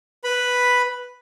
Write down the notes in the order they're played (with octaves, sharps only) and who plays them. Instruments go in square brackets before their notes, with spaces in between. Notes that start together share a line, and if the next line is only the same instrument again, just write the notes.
[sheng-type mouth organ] B4 B5